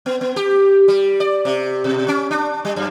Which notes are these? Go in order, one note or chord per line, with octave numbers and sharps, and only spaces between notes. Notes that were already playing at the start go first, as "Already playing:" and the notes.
B3
B3
G4
G3
D5
C3
B2
C#4
D4
G3
F#2